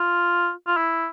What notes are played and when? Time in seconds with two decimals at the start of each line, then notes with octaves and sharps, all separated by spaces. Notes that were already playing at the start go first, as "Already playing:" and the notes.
Already playing: F4
0.67 F4
0.77 E4